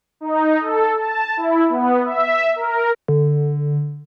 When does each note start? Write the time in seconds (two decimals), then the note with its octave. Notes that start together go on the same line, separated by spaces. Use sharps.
0.21 D#4
0.61 A4
0.96 A5
1.37 E4
1.69 B3
2.05 E5
2.56 A#4
3.08 D3